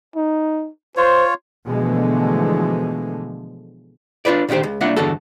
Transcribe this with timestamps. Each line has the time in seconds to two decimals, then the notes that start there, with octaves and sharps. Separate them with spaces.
0.16 D#4
0.97 F4 C5 C#5
1.68 B2 D3 E3 F3 G#3 A3
4.25 D4 F4 G#4 B4 D5
4.49 A#2 D3 D#3 G4 C5
4.63 C#2
4.81 C2 A#3 D4 F4 E5 F#5
4.96 E2 G2 D3 F#4 A4